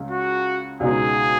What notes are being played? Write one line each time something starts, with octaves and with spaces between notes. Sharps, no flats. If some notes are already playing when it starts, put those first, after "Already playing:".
Already playing: C#2 C#3 G#3
F#4
C#2 B2 G#3 D#4 G#4